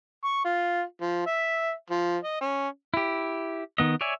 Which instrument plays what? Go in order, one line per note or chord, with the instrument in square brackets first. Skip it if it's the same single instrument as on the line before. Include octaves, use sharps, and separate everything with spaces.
[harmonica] C#6
F4
F3
E5
F3
D#5
C#4
[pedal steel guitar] E4 G4
D#3 B3 D#5
C#5 D5 E5 G#5